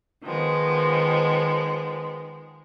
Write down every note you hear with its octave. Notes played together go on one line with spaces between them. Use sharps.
D#3 F3 G#3 B3